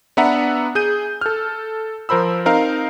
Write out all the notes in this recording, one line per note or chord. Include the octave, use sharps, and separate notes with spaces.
B3 D4 B4 E5 F#5 A#5
G#4 G6 D#7
A4 F6
F3 A#4 C5 B5 E6
C4 D#4 A#4 F5